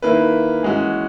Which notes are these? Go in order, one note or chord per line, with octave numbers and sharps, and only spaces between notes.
D#3 A#3 E4 B4
E3 G#3 C#4 F#4